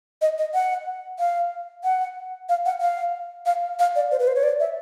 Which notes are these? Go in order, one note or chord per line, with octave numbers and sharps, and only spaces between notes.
D#5
D#5
F#5
F5
F#5
F5
F#5
F5
F5
F5
D5
C5
B4
C5
C#5
D5
E5